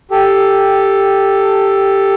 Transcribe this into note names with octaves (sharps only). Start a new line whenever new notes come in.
G4 A4